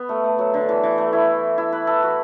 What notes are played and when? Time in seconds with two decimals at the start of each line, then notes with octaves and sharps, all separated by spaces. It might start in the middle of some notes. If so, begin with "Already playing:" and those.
Already playing: B3
0.09 A3
0.24 A3
0.39 F#3
0.54 D3
0.69 E3
0.83 E3
0.98 A3
1.13 E4
1.58 E4
1.72 B4
1.87 A4
2.03 F#4